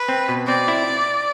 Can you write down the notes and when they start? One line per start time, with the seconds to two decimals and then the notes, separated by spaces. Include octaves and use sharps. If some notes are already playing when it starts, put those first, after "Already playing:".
Already playing: B4
0.09 C4
0.28 B2
0.47 C4 D5
0.68 E4